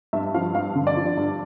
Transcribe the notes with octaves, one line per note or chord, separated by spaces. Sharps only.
G2 E5
F3 F5
G2 F5
D3
D5
F3
G2